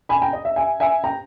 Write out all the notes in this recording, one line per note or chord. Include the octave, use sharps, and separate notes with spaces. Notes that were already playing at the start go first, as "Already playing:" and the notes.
G#5 B5
G5 A#5
D#5
E5
E5 G#5
E5 G#5
G5 A#5